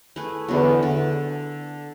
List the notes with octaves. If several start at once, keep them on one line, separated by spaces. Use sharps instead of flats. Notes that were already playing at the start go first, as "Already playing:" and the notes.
A3 E4 G#4 B4
E2 D3 F#3 B3
D3